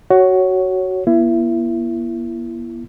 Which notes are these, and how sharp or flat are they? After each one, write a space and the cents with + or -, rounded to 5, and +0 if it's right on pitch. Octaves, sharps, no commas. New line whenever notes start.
F#4 +15 C#5 +0
B3 -45 E4 +30